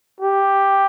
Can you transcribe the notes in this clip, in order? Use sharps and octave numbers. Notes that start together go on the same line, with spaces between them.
G4